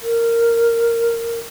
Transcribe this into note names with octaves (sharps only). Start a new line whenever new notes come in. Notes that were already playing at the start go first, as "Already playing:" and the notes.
A#4